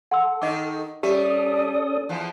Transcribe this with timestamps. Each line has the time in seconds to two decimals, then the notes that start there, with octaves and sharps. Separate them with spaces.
0.11 A4 F#5 C6 E6
0.42 D#3 D#4 D#5 D6
1.03 G3 C#4 G4 A4 D5 E5 D#6
2.09 E2 F3